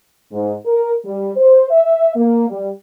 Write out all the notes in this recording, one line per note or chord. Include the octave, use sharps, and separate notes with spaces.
G#2
A#4
G3
C5
E5
A#3
G3